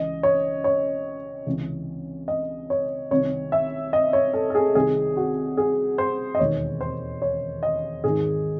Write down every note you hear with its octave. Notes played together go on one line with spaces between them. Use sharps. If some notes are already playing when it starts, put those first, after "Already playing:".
Already playing: C#2 C#3 E3 D#5
C#5
C#5
C#2 C3 E3
D#5
C#5
C2 C3 D#3 C#5
E5
D#5
C#5
A4
A4
G#4
C2 C3 D#3 G#4
F#4
G#4
C5
D#5
E1 D#2 D#3 C#5
C5
C#5
D#5
G#1 G#2 D#3 G#4